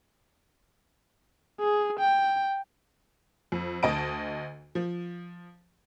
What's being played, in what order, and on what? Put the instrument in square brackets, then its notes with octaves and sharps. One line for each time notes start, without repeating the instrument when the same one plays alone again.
[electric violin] G#4
G5
[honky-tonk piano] F2
D2 D#5 A5 D7
F3